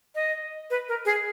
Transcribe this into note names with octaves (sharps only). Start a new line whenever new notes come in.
D#5
B4
A#4
G#4